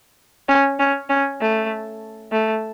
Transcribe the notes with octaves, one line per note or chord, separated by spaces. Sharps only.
C#4
C#4
C#4
A3
A3